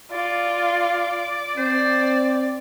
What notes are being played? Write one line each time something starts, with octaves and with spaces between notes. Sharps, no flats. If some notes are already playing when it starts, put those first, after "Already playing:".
F4 D5
C4 C5 D5